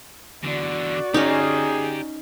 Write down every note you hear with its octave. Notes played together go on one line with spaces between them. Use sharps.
E2 D3 F#4 D5
C#4 D#4 G4 G#4 A#5